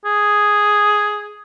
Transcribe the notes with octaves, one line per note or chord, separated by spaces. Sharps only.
G#4